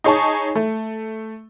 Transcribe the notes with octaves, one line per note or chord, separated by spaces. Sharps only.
D#4 G#4 C#5 G#5 A5 C#6
A3